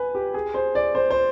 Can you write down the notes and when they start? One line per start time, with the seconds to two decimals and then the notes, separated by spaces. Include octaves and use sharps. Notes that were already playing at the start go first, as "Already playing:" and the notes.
Already playing: B4 G#5
0.15 G4
0.34 G#4
0.54 C5
0.75 D5
0.95 C5
1.11 C5